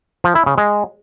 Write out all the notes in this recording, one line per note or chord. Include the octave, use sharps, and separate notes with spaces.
F3
E4
C#3
G#3